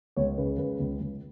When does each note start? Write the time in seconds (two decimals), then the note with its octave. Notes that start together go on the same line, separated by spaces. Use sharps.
0.16 C#2 C#5
0.38 C#3 B4
0.59 C#2 B4
0.80 C#2
1.01 C#2